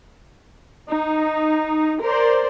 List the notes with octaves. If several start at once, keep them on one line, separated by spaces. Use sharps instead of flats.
D#4
A#4 C5 D5